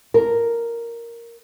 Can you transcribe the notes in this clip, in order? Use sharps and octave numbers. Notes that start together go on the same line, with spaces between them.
A#4